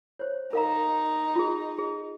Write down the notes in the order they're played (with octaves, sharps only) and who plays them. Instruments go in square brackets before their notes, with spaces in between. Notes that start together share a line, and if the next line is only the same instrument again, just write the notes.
[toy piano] C5 C#5
[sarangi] D#4 [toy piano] A#4 F5 A#5
[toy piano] F4 G#4
G#4